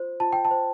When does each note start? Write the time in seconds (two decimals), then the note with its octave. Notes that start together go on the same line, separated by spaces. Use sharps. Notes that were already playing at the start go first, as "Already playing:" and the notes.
Already playing: F4 C5
0.20 F4 A5
0.33 G5
0.45 A5
0.51 C5